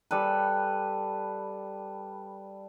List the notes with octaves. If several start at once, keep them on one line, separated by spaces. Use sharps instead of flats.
G3 A4 B4